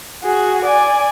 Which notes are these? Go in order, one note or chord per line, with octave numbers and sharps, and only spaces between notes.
F#4 G#4
D5 G#5